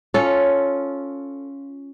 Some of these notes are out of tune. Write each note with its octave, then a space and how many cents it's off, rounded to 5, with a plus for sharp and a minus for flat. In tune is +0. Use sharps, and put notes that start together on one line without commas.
C#4 +0 F4 +0 A4 -10